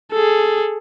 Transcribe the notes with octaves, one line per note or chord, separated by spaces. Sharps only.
G#4 A4